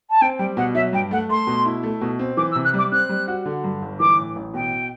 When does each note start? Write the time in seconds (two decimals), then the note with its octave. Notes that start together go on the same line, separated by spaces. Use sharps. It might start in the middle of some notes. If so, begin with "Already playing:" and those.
0.10 A5
0.21 C4 G5
0.38 G3 G5
0.57 B2 F#5
0.75 F#3 E5
0.93 G2 G5
1.11 A3 F#5
1.29 A3 C6
1.47 B2
1.66 E4
1.83 A3
2.01 B2
2.19 C4
2.37 E3 D6
2.51 E6
2.55 C3
2.64 F#6
2.74 G3 D6
2.92 C4 F#6
3.09 G3
3.28 F#4
3.46 D3
3.64 G2
3.82 G1
4.00 E3 D6
4.18 A2
4.36 A1
4.54 B2 G5